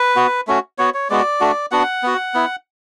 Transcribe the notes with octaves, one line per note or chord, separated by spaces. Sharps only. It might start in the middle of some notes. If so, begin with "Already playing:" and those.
Already playing: B4
B3 F#4
A3 C#4 F#4
B3 F#4 C#5
C#5
G#3 B3 F#4 D5
A3 D4 F#4
B3 D4 F#4 F#5
B3 F#4
B3 E4